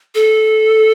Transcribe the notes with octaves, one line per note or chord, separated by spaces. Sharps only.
A4